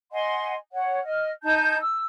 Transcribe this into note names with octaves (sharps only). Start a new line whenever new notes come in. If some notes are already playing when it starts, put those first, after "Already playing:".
D#5 F#5 G#5 C6
C#5 F#5
D#5 F6
D#4 A5 G6
E6